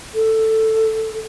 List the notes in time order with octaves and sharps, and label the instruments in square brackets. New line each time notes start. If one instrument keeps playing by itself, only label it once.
[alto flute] A4